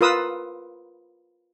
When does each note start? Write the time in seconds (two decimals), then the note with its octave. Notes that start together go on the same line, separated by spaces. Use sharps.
0.01 F4 A#4 B4 D#6 E6